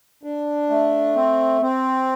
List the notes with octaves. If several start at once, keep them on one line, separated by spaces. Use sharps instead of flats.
D4
A3
C4
C4